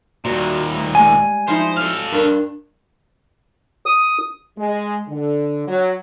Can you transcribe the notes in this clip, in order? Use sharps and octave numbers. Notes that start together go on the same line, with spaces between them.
D#2 A#2 F#4 D5 A5
D2
G3 G#3 G#5
F3 D#4 E4 C5
A4 F5
G2 D4 A#4
D#6
G#3
D3
F#3